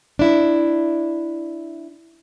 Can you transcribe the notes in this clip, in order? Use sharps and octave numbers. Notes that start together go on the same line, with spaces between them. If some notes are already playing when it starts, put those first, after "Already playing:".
D4 E4